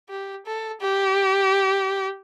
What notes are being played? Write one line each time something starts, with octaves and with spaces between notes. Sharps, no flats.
G4
A4
G4